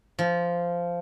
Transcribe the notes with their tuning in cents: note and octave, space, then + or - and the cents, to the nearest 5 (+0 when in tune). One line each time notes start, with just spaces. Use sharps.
F3 -10